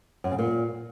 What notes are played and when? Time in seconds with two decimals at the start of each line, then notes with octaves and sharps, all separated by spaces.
0.24 F#2
0.31 C#3
0.39 A#2